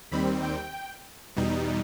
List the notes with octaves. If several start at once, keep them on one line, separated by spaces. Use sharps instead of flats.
D#2 D#3 G3 C4 B5
G5
E2 B2 G3 D#4